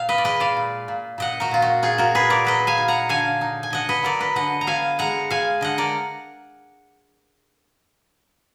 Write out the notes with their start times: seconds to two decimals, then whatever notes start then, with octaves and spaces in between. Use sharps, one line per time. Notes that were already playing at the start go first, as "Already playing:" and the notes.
Already playing: A#2 F5
0.09 B4 D#5
0.18 D5
0.24 G#3 B4 D#5
0.40 D5 F5
0.57 A#2
0.88 A#2
1.18 A#2 D#5 F#5
1.40 F#4 A#4
1.51 A#2 F4
1.62 F#4
1.82 A#2 F4 G#4
1.98 F#4 A#4
2.14 A#2 G#4 B4
2.30 A#4 D5
2.45 F#3 B4 D#5
2.67 F5 G#5
2.78 D#4
2.88 F#5 A#5
3.09 D3 F5 G#5
3.41 D#4
3.63 G#5
3.70 D3 D#5 F#5
3.89 B4 D#5
4.03 F#3 A#4 D5
4.20 B4 D#5
4.35 D3 D#5 F#5
4.61 A#5
4.67 B3 F5 G#5
4.99 G#3 F#5 A#5
5.30 G#3 F5 G#5
5.61 D3 D#5 F#5
5.78 A#4 D5